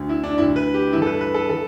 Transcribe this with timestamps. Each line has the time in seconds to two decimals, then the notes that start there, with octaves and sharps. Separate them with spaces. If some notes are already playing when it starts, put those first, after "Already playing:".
Already playing: D2 D3
0.09 E4
0.24 D4
0.38 D2 D3 E4
0.56 B4
0.74 G4
0.93 G2 E3 E4
1.02 A4
1.07 B4
1.21 B4
1.34 A4
1.49 E3 A4